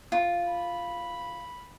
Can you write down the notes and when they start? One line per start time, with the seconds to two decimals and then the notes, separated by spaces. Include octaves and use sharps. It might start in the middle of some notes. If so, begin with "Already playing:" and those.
0.12 F4
0.47 B5